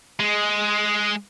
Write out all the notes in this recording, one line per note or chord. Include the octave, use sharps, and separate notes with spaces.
G#3